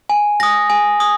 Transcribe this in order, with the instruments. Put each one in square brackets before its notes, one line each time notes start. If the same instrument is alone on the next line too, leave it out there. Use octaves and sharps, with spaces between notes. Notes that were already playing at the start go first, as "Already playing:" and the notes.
[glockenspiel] G#5
D#6 A#6
G#5
D#6